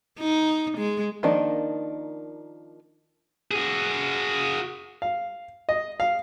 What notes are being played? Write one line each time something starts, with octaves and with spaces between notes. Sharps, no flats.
D#4
G#3
D#3 F3 A#3 D4 D#4
F#4 G#4
F5
D#5
F5